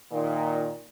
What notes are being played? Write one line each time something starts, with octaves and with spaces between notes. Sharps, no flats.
A#2 D#3